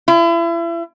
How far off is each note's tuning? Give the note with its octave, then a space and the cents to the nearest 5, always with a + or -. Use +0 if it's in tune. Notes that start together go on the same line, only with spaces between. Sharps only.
E4 +35